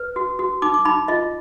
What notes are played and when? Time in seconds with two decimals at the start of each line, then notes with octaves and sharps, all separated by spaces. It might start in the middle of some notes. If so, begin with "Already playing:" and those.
Already playing: B4
0.16 F#4
0.39 F#4
0.62 D#4 D6
0.74 D6
0.85 D#4 B5
1.08 F4 D#5